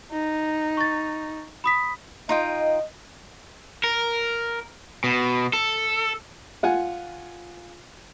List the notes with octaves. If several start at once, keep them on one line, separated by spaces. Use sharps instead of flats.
D#4
C#6 A6
B5 D#6 B6
D#4 F4 D#5 G5
A#4
B2
A4
F4 F#5 G#5